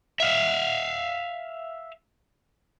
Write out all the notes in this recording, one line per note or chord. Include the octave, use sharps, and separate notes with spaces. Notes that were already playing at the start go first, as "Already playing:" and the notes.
E5 F5